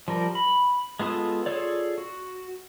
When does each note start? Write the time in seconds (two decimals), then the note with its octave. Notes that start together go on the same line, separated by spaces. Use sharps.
0.08 F3 G3 A#4
0.35 B5
0.99 G#3 B3 F4 A4 D#6
1.46 F4 G#4 A4 C#5 D5
1.98 F#4